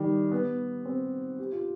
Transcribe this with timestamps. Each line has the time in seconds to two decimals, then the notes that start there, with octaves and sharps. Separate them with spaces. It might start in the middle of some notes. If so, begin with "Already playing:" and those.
Already playing: D#3 G3
0.32 B3
0.85 C4
1.38 G4
1.52 F4